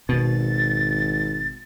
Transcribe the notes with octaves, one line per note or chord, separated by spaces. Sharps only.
G#1 B2 A6